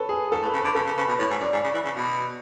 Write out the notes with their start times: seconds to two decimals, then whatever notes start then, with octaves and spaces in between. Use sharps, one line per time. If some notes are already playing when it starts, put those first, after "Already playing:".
Already playing: A4 B4 C#5
0.09 G#4
0.32 G#2 A4
0.42 A2
0.46 B4
0.53 C#3
0.60 D3 B4
0.75 C#3 A4
0.86 C#3
0.97 C#3 B4
1.08 B2
1.19 A2 C#5
1.30 G#2
1.41 F#2 D5
1.53 G#2
1.64 C#3
1.74 E3
1.85 C#3
1.96 B2